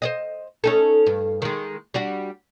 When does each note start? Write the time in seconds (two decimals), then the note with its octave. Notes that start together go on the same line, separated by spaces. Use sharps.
0.02 C5 D5 D#5
0.64 C#4 D#4 A4
1.06 G2
1.42 D#3 G#3
1.94 G3 D4 F#4